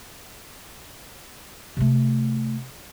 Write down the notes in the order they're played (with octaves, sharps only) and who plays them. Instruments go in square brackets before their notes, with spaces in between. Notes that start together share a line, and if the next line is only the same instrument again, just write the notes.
[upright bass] C3 A3